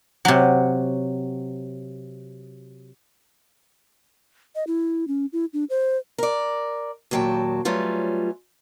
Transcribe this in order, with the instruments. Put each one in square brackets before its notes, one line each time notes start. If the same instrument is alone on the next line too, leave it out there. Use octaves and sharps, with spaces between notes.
[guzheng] C3 F#3
[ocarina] D#5
E4
C#4
E4
D4
C5
[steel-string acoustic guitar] A#4 D5
D#2 A#2 F#3 G5 A5
F#3 G3 A3 C#4 F4 B4